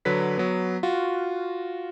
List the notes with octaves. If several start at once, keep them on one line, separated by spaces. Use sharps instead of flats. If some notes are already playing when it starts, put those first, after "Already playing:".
D3 F#3 B4 B6
F#3 B3
F4 F#4